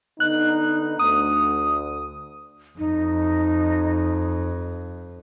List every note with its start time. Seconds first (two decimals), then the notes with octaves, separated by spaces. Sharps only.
0.20 D3 B3 D#4 F#6
0.99 D2 D#6
2.78 F2 D#4